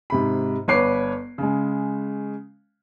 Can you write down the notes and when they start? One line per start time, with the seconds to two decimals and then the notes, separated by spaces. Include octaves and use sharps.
0.10 G#2 C3 B5
0.68 G1 B4 C#5 D6 C7
1.38 C#3 G#3